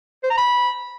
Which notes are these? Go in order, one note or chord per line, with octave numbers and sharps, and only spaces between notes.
C5
A#5
B5